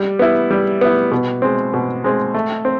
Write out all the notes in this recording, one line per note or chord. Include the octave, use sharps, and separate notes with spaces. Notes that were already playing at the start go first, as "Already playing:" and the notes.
Already playing: G3
B3 E4
G3
B3 E4
B2
G#3 C4
B2
G#3 C4
A3
C4